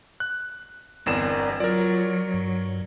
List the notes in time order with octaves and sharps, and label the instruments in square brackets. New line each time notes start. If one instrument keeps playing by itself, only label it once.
[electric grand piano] F#6
[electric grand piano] G1 E2 E7 [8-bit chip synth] C4 A#4 D5
[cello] F#3 [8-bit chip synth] F4 [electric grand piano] A#4 D5
[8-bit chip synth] G2